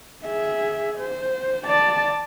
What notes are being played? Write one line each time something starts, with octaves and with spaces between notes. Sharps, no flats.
G#4 E5
C5
D5 A5